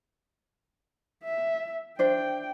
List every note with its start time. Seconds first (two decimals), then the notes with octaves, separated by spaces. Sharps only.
1.24 E5
1.99 D4 C5 E5 G5